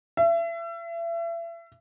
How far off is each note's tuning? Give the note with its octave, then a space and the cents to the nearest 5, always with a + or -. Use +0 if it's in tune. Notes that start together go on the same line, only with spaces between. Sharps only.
E5 +35